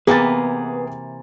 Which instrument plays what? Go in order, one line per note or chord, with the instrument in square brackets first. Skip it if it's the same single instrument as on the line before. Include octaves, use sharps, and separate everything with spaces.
[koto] C3 E3 A#3 [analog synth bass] B3 [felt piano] G#4 G5 A6 [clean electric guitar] B4